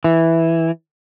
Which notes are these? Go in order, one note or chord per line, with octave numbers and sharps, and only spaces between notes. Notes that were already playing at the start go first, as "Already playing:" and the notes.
E3